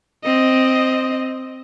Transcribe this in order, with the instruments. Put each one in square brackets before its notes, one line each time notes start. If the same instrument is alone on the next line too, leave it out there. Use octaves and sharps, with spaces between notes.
[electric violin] C4 D#5